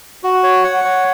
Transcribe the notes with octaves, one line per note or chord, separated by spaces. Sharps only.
F#4
C#5
F#5
C#5